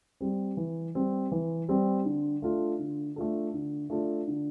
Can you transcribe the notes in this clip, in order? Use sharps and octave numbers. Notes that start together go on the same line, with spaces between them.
G3 C4
E3
G3 C4
E3
G3 C4
D3
A3 D4 F4 A4
D3
A3 D4 F4 A4
D3
A3 D4 F4 A4
D3